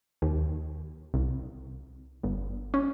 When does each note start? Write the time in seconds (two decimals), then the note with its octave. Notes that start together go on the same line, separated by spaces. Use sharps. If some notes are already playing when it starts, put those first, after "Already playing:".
0.22 D#2
1.14 C2
2.23 G1
2.74 C#4